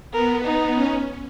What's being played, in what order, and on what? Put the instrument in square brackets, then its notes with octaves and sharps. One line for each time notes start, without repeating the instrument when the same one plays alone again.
[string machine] B3 [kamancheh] A#4
[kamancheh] D#4
[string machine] C#4